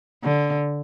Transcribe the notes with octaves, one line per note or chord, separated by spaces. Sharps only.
D3